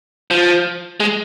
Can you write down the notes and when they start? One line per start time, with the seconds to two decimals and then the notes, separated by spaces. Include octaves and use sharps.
0.31 F3
1.00 G#3